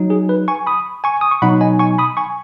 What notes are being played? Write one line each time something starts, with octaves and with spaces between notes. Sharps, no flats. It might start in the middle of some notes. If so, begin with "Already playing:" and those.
Already playing: F#3 D#4
G#4
B4
G#5 C#6
B5 D#6
G#5 C#6
D#6
C#6
B2 F#3 D#4 F#5 B5
D#5 G#5
G#5 C#6
B5 D#6
G#5 C#6